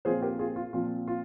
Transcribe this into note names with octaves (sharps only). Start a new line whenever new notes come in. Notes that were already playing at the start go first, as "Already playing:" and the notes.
A#2 F3 C4 F4 G#4 C5
G4 A#4
F4 G#4
F4
A#2 F3 C4 F4
F4